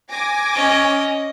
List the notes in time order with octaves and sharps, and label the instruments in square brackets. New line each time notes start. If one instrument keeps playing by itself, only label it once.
[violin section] G#5 D6 A#6
[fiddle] C#4 D#5